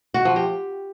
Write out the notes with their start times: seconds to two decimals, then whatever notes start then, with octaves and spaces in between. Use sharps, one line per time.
0.14 F#4
0.25 F3
0.36 G4